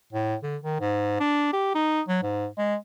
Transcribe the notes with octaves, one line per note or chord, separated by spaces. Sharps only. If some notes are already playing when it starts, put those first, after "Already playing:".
A2
D3
D#3
G#2
D4
G4
D#4
F#3
G#2
G#3